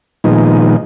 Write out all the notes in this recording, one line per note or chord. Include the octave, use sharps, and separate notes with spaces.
A#2 D#3 F3 G#3 B3 D#4